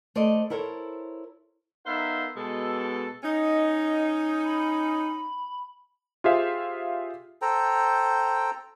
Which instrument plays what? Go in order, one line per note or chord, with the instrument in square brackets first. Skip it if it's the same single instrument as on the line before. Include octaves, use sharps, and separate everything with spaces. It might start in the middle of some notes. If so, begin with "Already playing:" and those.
[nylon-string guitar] A3 C5 D5 D#5
E4 A4 A#4 C5 C#5
[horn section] B3 D#4 A#4 C5 E5 F5
B2 G#3 A4
[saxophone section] C#4 D#4 [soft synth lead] D#5
[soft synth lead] B5
[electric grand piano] F4 G4 G#4 C5 E5 F5
[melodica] A4 C5 G5 A#5